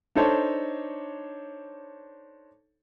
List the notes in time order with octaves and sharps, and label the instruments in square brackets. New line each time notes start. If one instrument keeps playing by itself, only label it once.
[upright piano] D4 D#4 A4 C5 C#5 A5